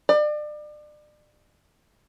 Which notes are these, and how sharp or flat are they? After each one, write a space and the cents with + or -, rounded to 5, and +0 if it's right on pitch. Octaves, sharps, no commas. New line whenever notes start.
D5 +35